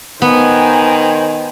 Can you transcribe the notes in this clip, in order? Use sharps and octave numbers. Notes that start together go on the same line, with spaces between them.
D#3 B3 C5 G#5